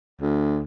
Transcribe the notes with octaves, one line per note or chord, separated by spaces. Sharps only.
D2